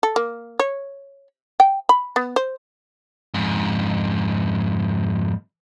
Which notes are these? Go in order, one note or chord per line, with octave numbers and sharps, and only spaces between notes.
A4
A#3
C#5
G5
B5
B3
C5
F2 G#2